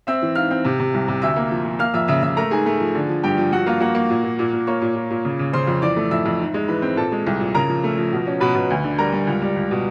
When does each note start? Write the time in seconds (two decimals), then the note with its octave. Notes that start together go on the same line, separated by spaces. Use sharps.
0.07 C4 E5 E6
0.22 E3
0.35 G#2 F5 F6
0.51 C4
0.65 C3
0.79 C3
0.94 C2
1.08 C3
1.22 D2 E5 E6
1.36 A#3
1.51 F3
1.65 F3
1.79 A#3 F5 F6
1.94 F2 E5 E6
2.08 C#3 E5 E6
2.22 C#3 E5 E6
2.37 A3 A#4 A#5
2.51 G#2 G#4 G#5
2.66 A3
2.80 F3
2.95 D3
3.09 F3
3.23 G2 G4 G5
3.38 F3
3.52 G2 F#4 F#5
3.66 A#3 F4 F5
3.81 A#3 F#4 F#5
3.95 A#3
4.10 A#2
4.23 A#2
4.39 A#2
4.53 A#2
4.67 A#3 C#5 C#6
4.82 A#2
4.96 A#2
5.11 A#2
5.25 C#3
5.39 C#3
5.53 C#3 C5 C6
5.67 F2
5.82 E3 D5 D6
5.97 A3
6.11 F2 E5 E6
6.26 F2
6.40 G#2
6.54 G#3
6.68 E3 B4 B5
6.82 C4
6.97 A#2 A4 A5
7.12 G#3
7.27 C2
7.40 A#2
7.55 C#3 A#4 A#5
7.69 F3
7.84 A3
7.98 F3
8.13 B2
8.27 C#4
8.40 B2 B4 B5
8.55 B2
8.70 D2
8.84 D3
8.98 G3 A#4 A#5
9.13 G3
9.27 C#2
9.42 G3
9.56 C#2
9.71 B2